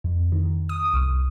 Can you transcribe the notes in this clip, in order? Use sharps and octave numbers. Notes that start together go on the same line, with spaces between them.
F2
D#3
D#6
C2